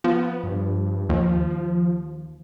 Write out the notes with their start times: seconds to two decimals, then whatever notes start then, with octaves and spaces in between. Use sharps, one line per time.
0.04 F3 B3
0.44 G2
1.09 D#2 F3